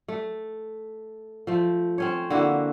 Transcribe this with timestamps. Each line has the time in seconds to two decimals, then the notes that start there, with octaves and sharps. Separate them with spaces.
0.08 A3
1.47 F3 A3
1.98 C4 C#4 C#5
2.30 D3 A#3 E4 F#4